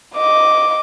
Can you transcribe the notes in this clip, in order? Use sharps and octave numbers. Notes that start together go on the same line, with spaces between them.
D#5 D6